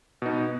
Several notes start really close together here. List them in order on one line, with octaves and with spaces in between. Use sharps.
B2 D#4 B3